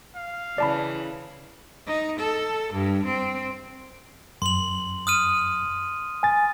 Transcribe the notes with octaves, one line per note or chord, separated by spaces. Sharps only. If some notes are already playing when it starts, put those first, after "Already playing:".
F5
C#3 E3 D5 A5 B5
D#4
A4
G2
C4
F#2 C6 F#7
D#6 F6 D#7
G#5 A6